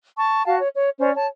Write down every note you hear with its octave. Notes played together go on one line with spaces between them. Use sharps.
A5 C#6
F#4 F5 A5
C#5
C#5
C#4 C5 D5
C#5 A5